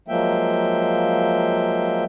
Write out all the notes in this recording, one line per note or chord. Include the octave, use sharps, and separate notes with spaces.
F3 F#3 G#3 A#3 E5 G5